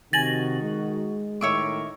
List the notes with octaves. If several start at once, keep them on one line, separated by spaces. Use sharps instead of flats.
C3 D#3 D#4 F#4 G#5 A6 A#6 F#7
G#3
A2 D#3 C#5 E5 D6